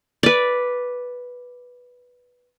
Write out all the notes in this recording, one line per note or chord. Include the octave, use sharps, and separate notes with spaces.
B4 D5